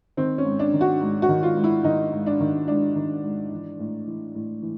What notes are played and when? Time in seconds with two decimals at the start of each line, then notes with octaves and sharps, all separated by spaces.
0.17 D#3 C4
0.38 C#4
0.45 G#2
0.59 D4
0.73 D#3
0.81 F#4
1.01 G#2
1.22 F#4
1.29 D#3
1.43 F4
1.57 G#2
1.64 E4
1.84 D#3 D#4
2.12 G#2
2.26 D4
2.40 D#3
2.68 G#2 D4
2.96 D#3
3.24 G#2
3.51 E3
3.79 A2
4.07 E3
4.35 A2
4.62 E3